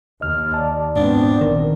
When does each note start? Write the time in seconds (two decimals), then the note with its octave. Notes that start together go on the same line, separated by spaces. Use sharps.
0.21 D#2 D#5 F6
0.54 D5 A5
0.96 G#2 B2 B3 C4 D4
1.41 A#1 D#3 A#4